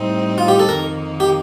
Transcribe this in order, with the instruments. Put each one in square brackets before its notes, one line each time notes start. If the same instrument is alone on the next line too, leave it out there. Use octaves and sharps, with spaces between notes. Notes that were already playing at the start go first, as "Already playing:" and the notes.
Already playing: [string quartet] A2 G3 C4 D#4
[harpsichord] F4
G4
A4
[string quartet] F2 D#3 A#3 D#4 [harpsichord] A#4
[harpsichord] G4